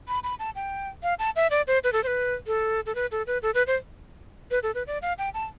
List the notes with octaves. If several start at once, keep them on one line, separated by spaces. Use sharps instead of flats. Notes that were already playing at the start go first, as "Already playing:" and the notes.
B5
B5
A5
G5
F5
A5
E5
D5
C5
B4
A4
C5
B4
A4
A4
B4
A4
B4
A4
B4
C5
B4
A4
B4
D5
F5
G5
A5